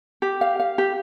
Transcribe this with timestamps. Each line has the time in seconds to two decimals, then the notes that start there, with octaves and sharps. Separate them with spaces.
0.22 G4
0.41 F5
0.60 F5
0.78 G4